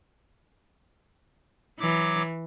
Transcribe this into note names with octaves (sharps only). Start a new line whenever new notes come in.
E3 F#3 D6